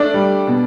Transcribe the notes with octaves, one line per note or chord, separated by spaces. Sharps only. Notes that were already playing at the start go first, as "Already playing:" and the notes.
Already playing: A3 D4 D5
G3
B2